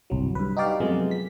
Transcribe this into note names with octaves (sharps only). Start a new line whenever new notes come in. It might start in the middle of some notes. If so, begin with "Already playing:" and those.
G1 C2 F#3
G2 B4
D#4 F#4 G4 D5 F5
F#2 C3 F3 G#3 A3 B3
B6